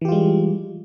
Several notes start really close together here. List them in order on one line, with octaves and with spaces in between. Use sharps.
E3 G4 F4 G#3 G3